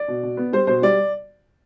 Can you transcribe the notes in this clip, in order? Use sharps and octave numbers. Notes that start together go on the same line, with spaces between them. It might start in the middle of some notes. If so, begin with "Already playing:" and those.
Already playing: D5
B2
B2
B3
G3 C5
B2 C5
G3 D5